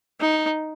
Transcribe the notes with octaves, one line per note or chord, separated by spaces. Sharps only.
D#4